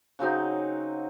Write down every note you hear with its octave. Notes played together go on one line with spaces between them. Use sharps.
C#3 F#3 C4 D#4